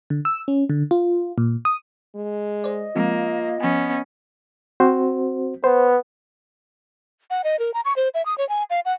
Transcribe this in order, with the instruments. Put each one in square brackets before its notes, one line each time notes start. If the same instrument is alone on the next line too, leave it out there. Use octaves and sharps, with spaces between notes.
[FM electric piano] D3
E6
C#4
D3
F4
A#2
D#6
[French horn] G#3
[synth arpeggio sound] C5 D5 [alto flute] D#5
[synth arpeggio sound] F3 G#3 C4 [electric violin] A#3 [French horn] F4
[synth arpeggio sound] F3 G#5 [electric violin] B3 C#4
[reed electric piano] C4 F#4 C5
[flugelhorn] B3 [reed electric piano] C5
[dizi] F#5
D#5
A#4
A#5
C#6
C5
E5
D#6
C#5
G#5
F5
F#5